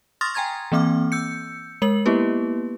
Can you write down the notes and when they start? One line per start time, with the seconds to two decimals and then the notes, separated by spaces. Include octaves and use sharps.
0.21 C6 C#6 D#6 F6 A6 A#6
0.34 G5 G#5 A#5 C6 G#6 A6
0.72 E3 A#3 C4 D6 F6
1.12 E6 G6 C#7
1.82 G#3 A#4 F#7
2.06 A#3 B3 E4 G4 B4